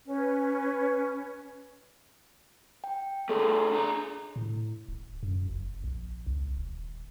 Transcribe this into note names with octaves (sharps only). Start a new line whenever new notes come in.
C#4 B4
G5
C#3 A3 G#4 A4
D4 A#5
A2
D1
F#2
F#1
A#1
C#2
D#1